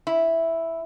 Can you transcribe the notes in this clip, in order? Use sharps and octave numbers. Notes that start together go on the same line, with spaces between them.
E4